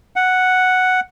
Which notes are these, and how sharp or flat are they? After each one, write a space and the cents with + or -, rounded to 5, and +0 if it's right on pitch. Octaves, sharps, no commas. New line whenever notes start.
F#5 +0